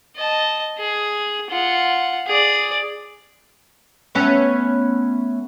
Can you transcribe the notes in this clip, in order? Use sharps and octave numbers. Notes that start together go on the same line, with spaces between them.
D#5 A5
G#4
F4 F#5
G#4 D5
A3 B3 C#4